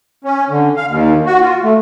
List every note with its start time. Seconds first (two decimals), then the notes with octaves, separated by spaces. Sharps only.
0.24 C#4
0.50 D3
0.76 F5
0.89 D#2
1.26 F#4
1.41 F4
1.63 A3